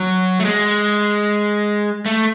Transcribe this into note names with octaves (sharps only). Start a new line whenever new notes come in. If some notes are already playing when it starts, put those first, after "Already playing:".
Already playing: F#3
A3
G#3
A3